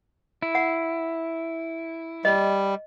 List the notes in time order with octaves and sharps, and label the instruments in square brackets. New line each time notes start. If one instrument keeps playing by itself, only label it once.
[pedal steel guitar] E4
[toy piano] F#5
[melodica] G3 [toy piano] D#5